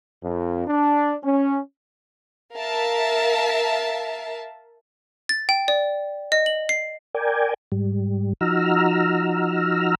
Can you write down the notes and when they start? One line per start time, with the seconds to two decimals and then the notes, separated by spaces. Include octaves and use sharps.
0.23 F2
0.67 D4
1.23 C#4
2.55 A#4 E5 F5 A5
5.29 A6
5.49 G5
5.68 D5
6.32 D#5
6.46 F#7
6.69 C7
7.15 A#4 D5 G5 G#5
7.72 G#2 G3
8.41 F3 D#4 F#4 A#5 E6 F6